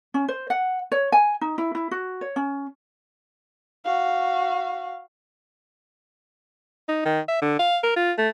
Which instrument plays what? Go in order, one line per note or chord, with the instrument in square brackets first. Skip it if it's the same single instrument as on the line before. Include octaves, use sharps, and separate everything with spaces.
[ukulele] C#4
C5
F#5
C#5
G#5
D#4
E4
E4
F#4
C#5
C#4
[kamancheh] F#4 F5
[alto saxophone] D#4
D#3
E5
D3
F5
A#4
F4
A3